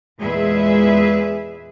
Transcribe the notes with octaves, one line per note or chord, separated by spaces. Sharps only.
E2 A#2 G#3 G#4 B4 E5